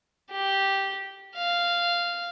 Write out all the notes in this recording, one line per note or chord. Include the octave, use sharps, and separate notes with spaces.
G4
F5